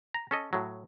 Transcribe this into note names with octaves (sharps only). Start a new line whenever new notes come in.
A#5
C#4 A4 D#5
A2 F#3